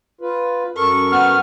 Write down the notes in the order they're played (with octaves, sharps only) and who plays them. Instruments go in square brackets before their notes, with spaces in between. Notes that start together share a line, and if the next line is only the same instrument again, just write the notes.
[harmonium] F4 B4
[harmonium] F#2 A4 A#4 [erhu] C#6
[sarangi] B3 [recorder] F6